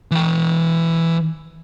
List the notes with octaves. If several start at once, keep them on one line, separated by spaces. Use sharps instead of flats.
E3 G5